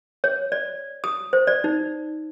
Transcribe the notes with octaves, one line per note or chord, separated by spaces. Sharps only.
C#5
D5
D#6
C5
D5
D#4